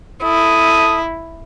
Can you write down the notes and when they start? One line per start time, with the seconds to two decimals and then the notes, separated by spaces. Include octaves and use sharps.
0.23 E4 A4 D#6